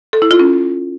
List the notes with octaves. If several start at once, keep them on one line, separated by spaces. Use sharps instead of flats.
A4
E4
F4
C#4